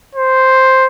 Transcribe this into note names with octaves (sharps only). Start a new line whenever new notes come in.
C5